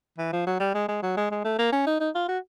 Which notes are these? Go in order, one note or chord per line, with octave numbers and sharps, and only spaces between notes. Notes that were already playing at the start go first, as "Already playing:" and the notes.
E3
F3
F#3
G3
G#3
G#3
F#3
G#3
G#3
A3
A#3
C#4
D#4
D#4
F4
F#4